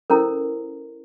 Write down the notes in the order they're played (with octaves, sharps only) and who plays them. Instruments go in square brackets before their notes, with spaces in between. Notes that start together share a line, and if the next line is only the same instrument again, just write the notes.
[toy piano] C#4 E4 A4 A#4 C5 A#5